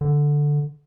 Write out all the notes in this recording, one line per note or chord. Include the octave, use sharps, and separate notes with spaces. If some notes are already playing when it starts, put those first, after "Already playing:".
D3